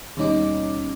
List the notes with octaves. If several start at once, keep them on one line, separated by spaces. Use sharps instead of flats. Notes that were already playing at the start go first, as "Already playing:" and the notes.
D#2 B2 G3 C#4 D#4 D6